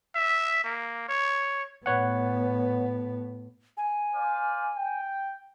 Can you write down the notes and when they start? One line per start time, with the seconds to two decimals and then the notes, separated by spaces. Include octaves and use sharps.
0.15 E5
0.64 A#3
1.09 C#5
1.86 A2 B3 B4 C#5 F#5
3.77 G#5
4.13 C5 D5 F5
4.77 G5